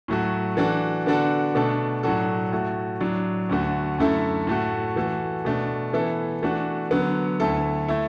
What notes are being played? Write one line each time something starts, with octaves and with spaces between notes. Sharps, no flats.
A2 F#3 A3 F#4
E3 D4 F#4 A4
D3 B3 D4 F#4 A4
B2 A3 D4 A4
A2 F#3 D4 F#4 A4
A2 A3 F#4
A2 F#3 D4
D2 D3 A3 F#4 A4
F#2 D3 A3 E4 A4
A2 A3 F#4
E3 A3 F#4 A4
B2 A3 D4
E3 B3 E4 A4
E3 A3 D4 F#4
D3 F#3 B3
D2 D3 A3 E4 A4
A3 E4